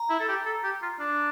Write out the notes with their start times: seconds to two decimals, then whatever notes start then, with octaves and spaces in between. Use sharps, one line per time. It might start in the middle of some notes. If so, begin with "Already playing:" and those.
Already playing: A#5
0.10 E4
0.20 A4
0.28 G4
0.46 A4
0.64 G4
0.82 F4
1.00 D4